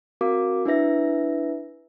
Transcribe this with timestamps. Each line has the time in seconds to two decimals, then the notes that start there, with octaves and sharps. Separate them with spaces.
0.21 C4 F#4 A#4 F5 D6
0.65 D4 E4 B4 E5 A#6